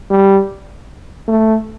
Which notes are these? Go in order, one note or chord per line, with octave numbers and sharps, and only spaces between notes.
G3
A3